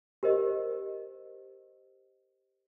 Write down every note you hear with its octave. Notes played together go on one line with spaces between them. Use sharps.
G4 A#4 C5 D#5